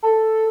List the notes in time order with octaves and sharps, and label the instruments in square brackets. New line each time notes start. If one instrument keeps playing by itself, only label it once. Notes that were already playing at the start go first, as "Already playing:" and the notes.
[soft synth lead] A4